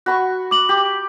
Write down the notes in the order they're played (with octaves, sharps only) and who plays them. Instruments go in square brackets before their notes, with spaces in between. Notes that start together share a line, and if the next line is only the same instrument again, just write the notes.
[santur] F#4 B5 C#6
[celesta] D6 F#7
[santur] G4